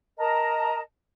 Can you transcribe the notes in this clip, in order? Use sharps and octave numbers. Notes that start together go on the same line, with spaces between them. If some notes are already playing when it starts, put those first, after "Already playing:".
A#4 D#5 A5 A#5